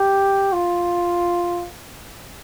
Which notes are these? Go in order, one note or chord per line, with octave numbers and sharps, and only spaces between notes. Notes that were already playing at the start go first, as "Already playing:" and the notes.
Already playing: G4
F4